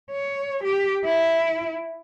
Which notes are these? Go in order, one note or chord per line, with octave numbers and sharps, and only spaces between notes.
C#5
G4
E4